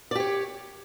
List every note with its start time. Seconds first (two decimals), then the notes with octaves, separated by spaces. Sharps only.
0.11 D5
0.15 G4
0.20 C#5